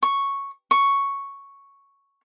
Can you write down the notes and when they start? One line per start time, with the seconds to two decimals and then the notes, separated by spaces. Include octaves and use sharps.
0.03 C#6
0.71 C#6